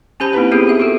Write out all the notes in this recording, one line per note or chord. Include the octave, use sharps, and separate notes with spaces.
C#4 G4 C5 A5 B5
A#3 C4 D#4 E4 B4
A#3 B3 F4 G4 G#4
G4 E5
F#4 G#4 A4